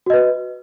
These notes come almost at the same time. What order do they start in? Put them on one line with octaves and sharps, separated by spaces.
F#4 D#5 B4